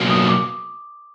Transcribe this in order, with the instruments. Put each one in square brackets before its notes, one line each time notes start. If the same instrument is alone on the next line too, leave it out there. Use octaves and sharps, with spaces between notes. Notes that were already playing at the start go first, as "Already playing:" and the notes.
Already playing: [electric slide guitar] B2 F#3 A#3
[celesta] D#6
D6